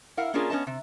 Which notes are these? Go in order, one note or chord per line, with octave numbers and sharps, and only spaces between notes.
E4 A#4 F5 F#5
A#3 C#4 D4 F4 G#4 A#4
B3 C#4 C5 D#5 A5
C3